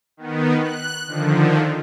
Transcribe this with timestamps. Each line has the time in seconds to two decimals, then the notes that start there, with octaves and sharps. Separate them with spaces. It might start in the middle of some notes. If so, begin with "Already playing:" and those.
0.17 D#3 B3
0.61 F#6
1.07 D3 D#3 F3